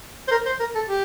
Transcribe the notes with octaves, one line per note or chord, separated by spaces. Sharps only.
C5
A#4
C5
A#4
A4
G4